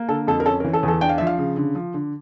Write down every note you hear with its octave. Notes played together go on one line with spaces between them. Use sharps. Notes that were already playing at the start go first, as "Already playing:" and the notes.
Already playing: A#3
D3 A4
F2 A4
A#4
C#4 A4
A#4
E3
A4
E2
A4
D4 G5
F5
F3 E5
F5
C#3
D3
F3
D3